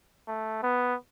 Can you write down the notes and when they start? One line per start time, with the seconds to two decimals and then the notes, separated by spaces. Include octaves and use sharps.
0.28 A3
0.63 B3